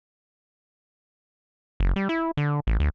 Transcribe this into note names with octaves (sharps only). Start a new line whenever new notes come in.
F#1
G3
E4
D3
A1
D2